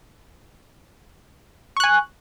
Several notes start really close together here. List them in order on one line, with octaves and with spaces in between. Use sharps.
C#6 F#6 G#5